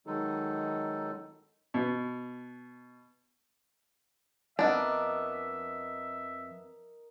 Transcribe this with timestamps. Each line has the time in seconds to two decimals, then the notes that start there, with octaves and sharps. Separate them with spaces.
0.07 D#3 F#3 G#3 D#4 A4
1.74 B2
4.59 F2 B3 D4 A#4 D#5 E5